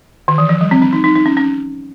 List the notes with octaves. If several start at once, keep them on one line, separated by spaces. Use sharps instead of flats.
D#3
E3
F3
G3
C4
D4
D#4
D#4
D#4
C#4
C#4